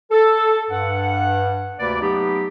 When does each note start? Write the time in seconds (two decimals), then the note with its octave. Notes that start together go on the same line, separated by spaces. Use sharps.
0.12 A4
0.71 G2 F#5
1.80 D2 C3 A#3 B4 D5
2.01 F#3 A3 B3 D#4 G4